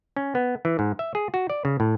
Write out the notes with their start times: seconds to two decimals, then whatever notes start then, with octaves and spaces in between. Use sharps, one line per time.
0.17 C#4
0.35 B3
0.65 E3
0.79 G#2
0.99 E5
1.15 G#4
1.34 F#4
1.50 D5
1.65 C#3
1.80 A2